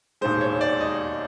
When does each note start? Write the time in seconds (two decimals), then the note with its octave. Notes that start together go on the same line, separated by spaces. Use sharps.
0.21 E1 D#2 D#3 G#3 C5
0.41 C#5
0.61 D5
0.81 D#5